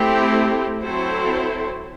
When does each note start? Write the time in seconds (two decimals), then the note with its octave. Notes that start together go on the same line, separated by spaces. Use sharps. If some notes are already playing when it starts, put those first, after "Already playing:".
Already playing: A3 C4 E4 G4
0.83 F#3 C4 E4 A4 C5